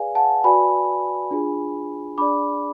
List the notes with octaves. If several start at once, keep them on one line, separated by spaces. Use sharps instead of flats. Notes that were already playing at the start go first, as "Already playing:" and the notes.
Already playing: G#4 B4 D5 F5 G#5
F#5 A5
F#4 B4 D5 G#5 B5
D4 F4 G#4
D4 G#4 D5 B5 D6